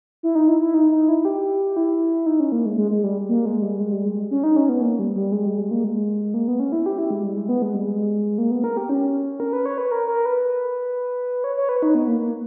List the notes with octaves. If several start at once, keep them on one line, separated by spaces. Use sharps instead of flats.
E4
D#4
E4
E4
D#4
D#4
E4
G4
E4
D#4
C#4
A#3
G#3
G#3
G#3
G3
A#3
G#3
G3
G#3
G3
G#3
C#4
D#4
C#4
B3
A#3
G3
G3
G#3
G3
G#3
A#3
G#3
A#3
B3
C#4
E4
G4
E4
G#3
G3
G#3
B3
G#3
G3
G#3
A#3
B3
A#4
G4
C#4
A#4
B4
C#5
B4
A#4
A#4
B4
C#5
C#5
B4
D#4
B3
A#3
A#3